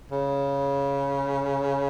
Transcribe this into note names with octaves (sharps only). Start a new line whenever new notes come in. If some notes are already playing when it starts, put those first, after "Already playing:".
C#3